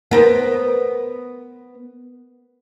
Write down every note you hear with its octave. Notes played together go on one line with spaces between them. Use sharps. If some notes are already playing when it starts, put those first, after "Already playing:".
B3 A#4 C5